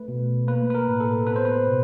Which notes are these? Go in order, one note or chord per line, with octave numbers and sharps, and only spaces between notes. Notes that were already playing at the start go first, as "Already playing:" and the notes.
Already playing: A3 B4
B2
A#3 B4
B4
A#4
A2
A4
B3 B4
C5
B4
B2